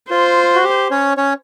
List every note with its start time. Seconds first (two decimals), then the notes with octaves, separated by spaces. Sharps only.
0.10 F4 C5
0.56 F#4
0.64 G4
0.91 C#4 C#5
1.17 C#4 C#5